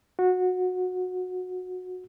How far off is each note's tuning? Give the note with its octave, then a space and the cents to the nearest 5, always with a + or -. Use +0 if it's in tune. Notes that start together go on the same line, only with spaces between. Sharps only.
F#4 -20